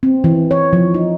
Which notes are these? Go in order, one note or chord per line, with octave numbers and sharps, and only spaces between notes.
C4
E3
C#5
F3
D#4